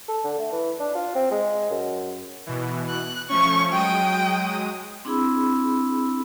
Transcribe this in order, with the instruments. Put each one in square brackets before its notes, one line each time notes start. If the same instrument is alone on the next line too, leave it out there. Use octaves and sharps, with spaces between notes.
[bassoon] A4
D3
A3
E3
D4
F4
C4
G#3
F#2
[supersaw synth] B2 E3
[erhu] F#6
[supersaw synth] F3 A3 C#4 [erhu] C#6
[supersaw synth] F#3 G#3 D#6 [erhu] G5
[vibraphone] C4 D4 E4 G#4 B5 E6